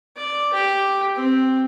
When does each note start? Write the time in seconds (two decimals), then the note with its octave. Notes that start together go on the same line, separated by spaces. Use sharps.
0.17 D5
0.53 G4
1.16 C4